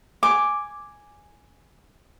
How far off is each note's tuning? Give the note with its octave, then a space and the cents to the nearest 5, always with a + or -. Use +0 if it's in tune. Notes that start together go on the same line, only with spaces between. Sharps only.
G#5 +0 D6 +0